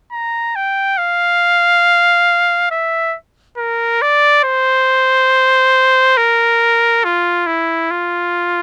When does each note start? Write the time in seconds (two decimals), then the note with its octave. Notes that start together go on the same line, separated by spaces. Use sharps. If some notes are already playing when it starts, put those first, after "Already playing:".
0.12 A#5
0.55 G5
0.98 F5
2.71 E5
3.57 A#4
4.02 D5
4.44 C5
6.17 A#4
7.04 F4
7.47 E4
7.91 F4